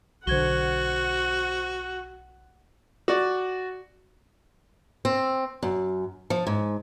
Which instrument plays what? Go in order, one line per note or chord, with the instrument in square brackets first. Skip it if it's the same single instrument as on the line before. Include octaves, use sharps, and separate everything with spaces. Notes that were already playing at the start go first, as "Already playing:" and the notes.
[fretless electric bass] B1 D3 [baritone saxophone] F#4 [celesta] C5 G#6 G7 [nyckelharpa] F#5
[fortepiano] F#4 D5
[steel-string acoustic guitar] C4
F#2
F3
G#2